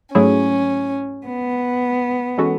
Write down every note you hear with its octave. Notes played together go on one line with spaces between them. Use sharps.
G#2 F#3 A3 C#4 E4 G#4
B3
E3 G#3 C#4 F#4 A4